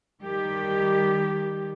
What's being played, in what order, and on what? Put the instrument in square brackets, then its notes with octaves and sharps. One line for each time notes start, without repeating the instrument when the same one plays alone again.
[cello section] D#3 G3 G4